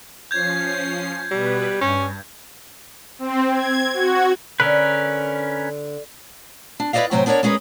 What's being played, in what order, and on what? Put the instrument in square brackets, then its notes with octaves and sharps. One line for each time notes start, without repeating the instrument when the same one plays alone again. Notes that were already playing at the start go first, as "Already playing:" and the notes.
[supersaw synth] F3 C#4 C7 [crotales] G6 G#6
[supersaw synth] B2 B4 [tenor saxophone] G3
[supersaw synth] G2 [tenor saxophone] C#4
[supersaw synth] C4
G#6
F#4
[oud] D3 [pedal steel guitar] C#4 A#4 B4
[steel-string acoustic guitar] D4
E4 B4 C5 D5 D#5 F5
A2 C3 F#3 C5 G5 G#5
B3 D4 A#4 C#5 D5
G#3 C#4 G#4 A#4 B4